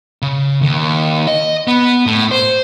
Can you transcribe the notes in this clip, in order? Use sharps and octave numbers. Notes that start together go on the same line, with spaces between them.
C#3
D#2
D#5
B3
A2
C5